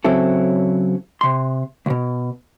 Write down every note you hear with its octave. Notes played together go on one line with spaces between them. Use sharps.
C#3 F#3 C4 E4 A4
C3 C6
C#2 B2